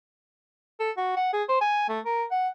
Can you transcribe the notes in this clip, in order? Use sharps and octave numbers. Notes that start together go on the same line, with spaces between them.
A4
F#4
F#5
G#4
C5
G#5
A3
A#4
F#5